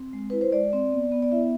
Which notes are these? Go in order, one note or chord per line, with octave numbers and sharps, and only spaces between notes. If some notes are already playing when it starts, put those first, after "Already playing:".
Already playing: C4
G#3
E4 B4
C5
G#3 D5
C4
B3
B3
D5
E4 E5